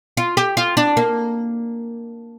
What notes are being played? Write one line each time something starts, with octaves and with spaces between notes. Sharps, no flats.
F4
G4
F4
D4
A#3